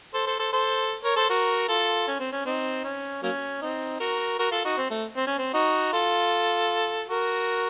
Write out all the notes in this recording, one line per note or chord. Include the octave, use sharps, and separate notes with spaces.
A4 C5
A4 C5
A4 C5
A4 C5
A#4 C#5
A4 C5
F#4 A#4
F4 A4
C#4
C4
C#4
C4 D#4
C#4
F#3 A#3 C#4
C4 D#4
F#4 A#4
F#4 A#4
F4 A4
D#4 F#4
C4
A3
C4
C#4
C4
D#4 F#4
F4 A4
F#4 A#4